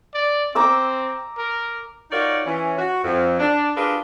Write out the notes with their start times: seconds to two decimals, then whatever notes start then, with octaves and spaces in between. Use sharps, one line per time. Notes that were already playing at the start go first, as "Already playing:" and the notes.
0.14 D5
0.55 C4 A#5 D6 E6
1.38 A#4
2.11 D#4 F4 F#4 A#4 C#5 D5
2.46 E3 C#4
2.78 F#4
3.03 F2
3.40 D4
3.75 D4 F4 G4 G#4 A#4 B4